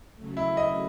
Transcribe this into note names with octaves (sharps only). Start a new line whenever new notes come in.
C#3 F#3 A3
E4
D#5